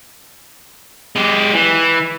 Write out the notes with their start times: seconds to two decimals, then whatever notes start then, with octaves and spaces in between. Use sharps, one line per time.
1.16 G#3 G4
1.54 E3